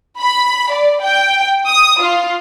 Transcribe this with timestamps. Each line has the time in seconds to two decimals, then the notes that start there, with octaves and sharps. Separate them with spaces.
0.19 B5
0.72 D5
1.02 G5
1.66 D#6
2.00 F4